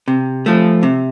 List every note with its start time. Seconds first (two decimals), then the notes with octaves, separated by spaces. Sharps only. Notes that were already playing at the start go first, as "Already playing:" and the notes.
0.08 C3
0.46 F3 A3
0.83 C3